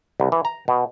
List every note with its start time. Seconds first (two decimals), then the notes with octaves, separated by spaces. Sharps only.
0.20 C2
0.32 E3
0.45 A#5
0.68 B2